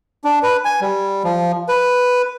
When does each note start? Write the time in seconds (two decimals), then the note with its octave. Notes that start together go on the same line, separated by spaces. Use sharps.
0.24 D4
0.43 B4
0.65 G#5
0.81 G3
1.24 F3
1.69 B4